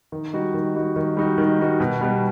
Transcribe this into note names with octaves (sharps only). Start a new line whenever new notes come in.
D#3
G3 D#4 F#4
D#3
G3 D#4 F#4
D#3
G3 D#4 F#4
D#3
G3 D#4 F#4
B2
G3 B3